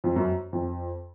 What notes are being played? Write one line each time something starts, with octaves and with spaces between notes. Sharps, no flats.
F2
F#2
F2